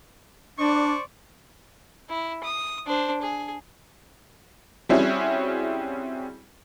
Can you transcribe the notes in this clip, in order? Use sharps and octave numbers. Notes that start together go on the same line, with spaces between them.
D4 C5 D5 C#6
E4
D#6
D4 C5
G#4
G3 C4 C#4 E4 F#4 G#4